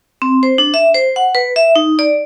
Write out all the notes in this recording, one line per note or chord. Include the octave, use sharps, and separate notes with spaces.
C4
C5
D4
E5
C5
F#5
B4
E5
D#4
D5